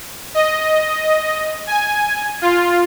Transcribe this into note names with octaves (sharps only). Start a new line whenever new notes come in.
D#5
G#5
F4